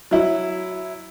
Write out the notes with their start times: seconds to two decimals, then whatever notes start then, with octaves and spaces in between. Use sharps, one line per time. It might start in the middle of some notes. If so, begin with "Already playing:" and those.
0.11 F#3 E4